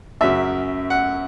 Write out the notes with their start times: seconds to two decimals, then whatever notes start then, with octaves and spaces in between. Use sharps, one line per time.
0.21 F#2 C#3 F#3 E5
0.90 F#5